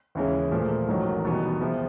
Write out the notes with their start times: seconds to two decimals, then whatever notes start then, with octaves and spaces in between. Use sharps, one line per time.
0.15 D#2 C#3 E3 G#3 C#4
0.52 A#2 F3 A3
0.88 A1 G#2 D#3 F#3
1.25 E2 B2 G3 B3 D#4
1.60 C3 F3 G#3 B3